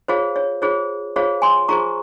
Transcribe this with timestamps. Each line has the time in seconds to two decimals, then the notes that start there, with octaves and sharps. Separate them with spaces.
0.08 F4 G#4 C5 C#5 F5
0.36 C#5
0.62 F4 G#4 C5 C#5
1.16 F4 G#4 C5 C#5 F5
1.42 G#5 C6
1.68 F4 G#4 C5 A#5 C#6